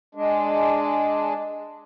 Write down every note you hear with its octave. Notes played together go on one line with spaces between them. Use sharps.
G#3 D4